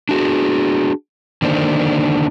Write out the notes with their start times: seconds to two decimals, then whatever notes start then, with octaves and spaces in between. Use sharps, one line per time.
0.09 D4 F#4 G#4
1.42 D3 D#3 A#3 D4 D#4 C5